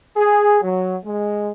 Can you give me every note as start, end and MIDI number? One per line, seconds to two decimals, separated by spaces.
0.16 0.59 68
0.62 0.96 54
1.05 1.52 56